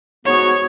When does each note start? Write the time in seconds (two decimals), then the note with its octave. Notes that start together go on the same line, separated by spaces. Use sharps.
0.24 G#2 F#3 B3 F#4 C#5